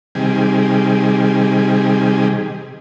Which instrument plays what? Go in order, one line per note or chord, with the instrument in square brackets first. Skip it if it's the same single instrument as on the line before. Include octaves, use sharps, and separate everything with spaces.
[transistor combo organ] C3 D#3 G3 G#4